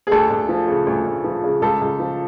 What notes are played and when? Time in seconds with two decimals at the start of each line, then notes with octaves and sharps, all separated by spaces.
0.07 G#4
0.11 D2 A4
0.30 D2
0.49 F3
0.68 C#3
0.87 D2
1.06 D2
1.24 F3
1.44 C#3
1.62 C#2 A4
1.81 C#2
1.99 F3